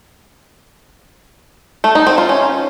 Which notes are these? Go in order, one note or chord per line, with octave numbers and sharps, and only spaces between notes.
A3
D#4
C4
F4
C#4